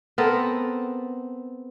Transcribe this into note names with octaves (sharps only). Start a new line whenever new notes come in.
B3 C4 A4 A#4